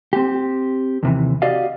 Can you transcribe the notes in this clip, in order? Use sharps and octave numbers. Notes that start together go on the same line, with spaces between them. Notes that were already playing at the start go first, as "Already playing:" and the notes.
C4 G4
D#2 C3 E3
F#4 G4 D5 D#5 F5